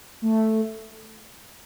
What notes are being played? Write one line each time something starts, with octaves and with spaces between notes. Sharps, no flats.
A3